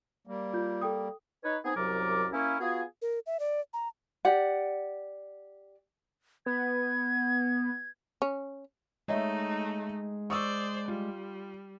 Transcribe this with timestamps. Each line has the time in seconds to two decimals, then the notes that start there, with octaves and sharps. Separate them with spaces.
0.27 G3 A#3
0.54 F4 G6
0.82 A4 G5 D#6
1.44 D#4 B4 C#5
1.65 B3 C4 D#4 G#4
1.76 C2 F#2 F#3 A#4 D5 D6
2.33 A#3 C#4 E4
2.60 B3 F4 F#4 G#4
3.02 A#4
3.26 E5
3.40 D5
3.73 A#5
4.25 G4 D5 F#5
6.46 B3 G#6
8.22 C#4
9.08 G#3 A3 D#4 C#5 D#5 E5
10.30 C5 D5 C#6 D#6 E6
10.88 G3 F4